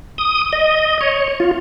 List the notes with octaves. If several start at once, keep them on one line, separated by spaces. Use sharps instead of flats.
D#6
D#5
C#5
F4